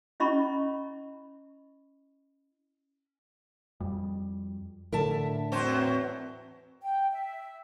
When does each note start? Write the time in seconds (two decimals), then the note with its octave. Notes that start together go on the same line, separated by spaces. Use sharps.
0.20 C#4 E4 D#5 A#5 B5 C#6
3.80 F2 G3
4.93 A2 D3 A#4 E5 A5
5.52 E2 F#3 C4 C5
6.82 G5
7.12 E5